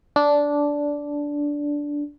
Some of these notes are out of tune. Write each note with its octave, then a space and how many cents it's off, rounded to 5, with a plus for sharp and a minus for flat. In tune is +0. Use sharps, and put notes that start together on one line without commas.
D4 -10